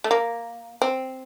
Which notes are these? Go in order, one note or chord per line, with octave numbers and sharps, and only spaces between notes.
A3
A#3
C4